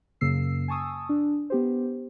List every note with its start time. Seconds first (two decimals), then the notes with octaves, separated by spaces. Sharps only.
0.21 F#2 C#3 A#3 E6 C7
0.68 G#5 A5 C#6 D#6 E6
1.09 D4
1.50 B3 G4 C5